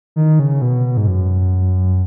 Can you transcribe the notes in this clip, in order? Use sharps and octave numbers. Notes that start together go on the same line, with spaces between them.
D#3
C#3
B2
G#2
F#2